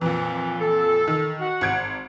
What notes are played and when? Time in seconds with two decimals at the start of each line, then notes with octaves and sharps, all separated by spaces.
0.01 F2 A#2 E3
0.60 A4
1.08 D#3
1.40 F#4 F#5
1.61 G#1 G#6 D7